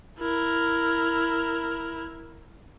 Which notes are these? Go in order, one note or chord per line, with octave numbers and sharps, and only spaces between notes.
E4 A#4